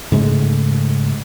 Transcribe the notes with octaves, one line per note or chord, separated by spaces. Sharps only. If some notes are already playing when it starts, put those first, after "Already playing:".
G#2 C#3 G#3 A3